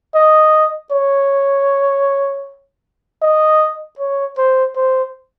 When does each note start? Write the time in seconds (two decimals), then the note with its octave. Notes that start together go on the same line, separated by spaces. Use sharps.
0.15 D#5
0.92 C#5
3.22 D#5
3.99 C#5
4.38 C5
4.76 C5